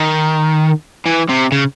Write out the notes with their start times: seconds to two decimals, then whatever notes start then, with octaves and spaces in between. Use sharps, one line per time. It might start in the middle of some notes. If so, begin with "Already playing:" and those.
Already playing: D#3
1.06 E3
1.29 C3
1.52 C#3